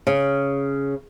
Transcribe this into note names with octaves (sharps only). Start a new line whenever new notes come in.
C#3